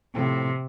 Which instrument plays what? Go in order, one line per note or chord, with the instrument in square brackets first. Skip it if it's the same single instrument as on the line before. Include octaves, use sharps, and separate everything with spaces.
[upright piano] A2 F3 A3 C4 [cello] C3